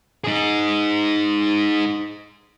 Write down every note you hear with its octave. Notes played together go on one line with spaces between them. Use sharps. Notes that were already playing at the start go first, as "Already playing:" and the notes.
D#4 G#4